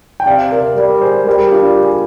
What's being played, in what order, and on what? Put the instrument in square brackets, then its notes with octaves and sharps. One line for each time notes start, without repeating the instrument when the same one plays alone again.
[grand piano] G5
[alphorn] C3 [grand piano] D5 F5
[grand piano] A#4 D5
[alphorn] G3 [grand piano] A#4 D5
[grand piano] G#4 C5
[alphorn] G3 [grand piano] G4 A#4
[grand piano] D4 F4
G4
G#4